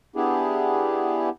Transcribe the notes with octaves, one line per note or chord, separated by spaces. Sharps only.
B3 D4 E4 G4 G#4